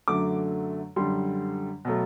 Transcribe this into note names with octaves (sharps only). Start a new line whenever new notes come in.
F#2 D3 F#3 A3 D6
F#2 D3 G3 C6
B2 F#3 A3